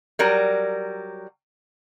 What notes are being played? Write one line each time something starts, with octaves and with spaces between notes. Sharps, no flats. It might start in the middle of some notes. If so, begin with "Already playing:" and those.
F#3 G3 A#4